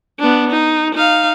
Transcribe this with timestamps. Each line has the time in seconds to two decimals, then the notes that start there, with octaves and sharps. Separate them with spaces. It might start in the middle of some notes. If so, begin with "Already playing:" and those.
0.20 B3 D4
0.50 D#4
0.94 D#4 F5